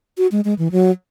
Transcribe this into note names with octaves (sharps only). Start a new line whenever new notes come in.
F#4
G#3
G#3
E3
F#3